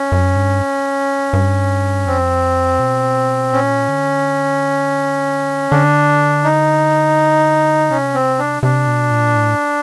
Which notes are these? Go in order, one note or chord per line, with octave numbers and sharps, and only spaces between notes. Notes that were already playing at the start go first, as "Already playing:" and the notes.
Already playing: C#4
F#2
G2
G2
F2 C4
B2
A#2 C#4
D3
D3 D4
D#4
C3 C#4
C4
D4
C3 D4
B2
A#2
A2